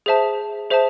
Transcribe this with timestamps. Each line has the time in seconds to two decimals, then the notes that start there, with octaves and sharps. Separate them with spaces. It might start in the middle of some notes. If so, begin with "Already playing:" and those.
0.06 G#4 C5 E5 A5
0.70 G#4 C5 E5 A5